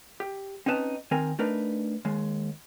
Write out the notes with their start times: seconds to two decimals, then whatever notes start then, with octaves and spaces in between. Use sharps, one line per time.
0.20 G4
0.66 C4 C#4 D#4 B4 A5
1.11 D#3 C4 A#4 G#5
1.39 A3 D4 D#4 A#4 B4
2.05 D#2 G#3